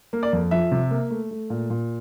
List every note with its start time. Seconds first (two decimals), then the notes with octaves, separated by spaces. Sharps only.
0.13 A#3
0.23 D5
0.33 F2
0.51 F3 E5
0.72 C3
0.91 A#3
1.11 A3
1.31 A3
1.50 A#2
1.70 A#2